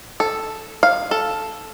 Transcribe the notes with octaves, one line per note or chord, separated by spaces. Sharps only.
A4
F5
A4